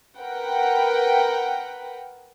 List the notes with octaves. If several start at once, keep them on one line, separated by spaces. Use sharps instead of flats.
A#4 B4 F#5 G5